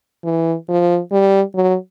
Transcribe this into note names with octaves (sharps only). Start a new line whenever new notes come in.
E3
F3
G3
F#3